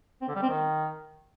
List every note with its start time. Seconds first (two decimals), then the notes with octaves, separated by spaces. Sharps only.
0.22 C4
0.29 D3
0.35 G3
0.42 C4
0.49 D#3